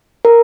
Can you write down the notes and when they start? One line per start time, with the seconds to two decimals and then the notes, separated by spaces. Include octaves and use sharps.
0.25 A#4